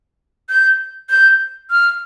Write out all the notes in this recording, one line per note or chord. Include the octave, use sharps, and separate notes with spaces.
G6
G6
F6